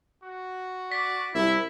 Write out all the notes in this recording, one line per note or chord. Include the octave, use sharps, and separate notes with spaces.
F#4
D5 B6
C2 E4 E5